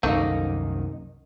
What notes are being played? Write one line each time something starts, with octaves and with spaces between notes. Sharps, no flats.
C2 F#2 D#3 A3 A#3 C4 D#4 F#4